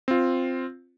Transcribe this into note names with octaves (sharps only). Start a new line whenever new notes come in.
C4 F4